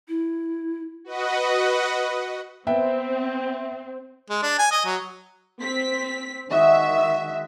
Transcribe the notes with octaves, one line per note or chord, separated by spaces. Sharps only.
E4
F#4 B4 D#5 F#5
B3 C4 E5 G5
G#3
D4
G#5
D#5
F#3
C4 B6
D#3 G#3 F#4 D#5 E5